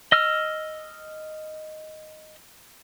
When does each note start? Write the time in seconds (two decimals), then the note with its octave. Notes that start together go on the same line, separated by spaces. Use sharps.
0.12 D#5 E6 F6